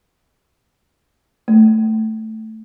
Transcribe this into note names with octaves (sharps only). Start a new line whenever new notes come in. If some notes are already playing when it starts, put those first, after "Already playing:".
A3